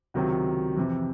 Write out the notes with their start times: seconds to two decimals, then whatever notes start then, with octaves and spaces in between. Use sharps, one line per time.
0.14 C#2 C3 D#3 F#3
0.77 F2 C3 E3